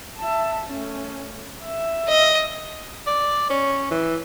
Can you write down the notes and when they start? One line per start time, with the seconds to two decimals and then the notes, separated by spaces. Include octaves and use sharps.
0.19 E5 A5
0.66 A3 C#4
1.65 E5
2.08 D#5
3.07 D5
3.50 C#4
3.91 E3